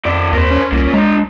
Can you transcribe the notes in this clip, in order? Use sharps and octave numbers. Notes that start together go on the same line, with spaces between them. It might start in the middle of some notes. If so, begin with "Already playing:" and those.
F2 D#3 D5
D#2 A#4 C5
C#4
C2 A#2 A#3
G#3 D4 A#5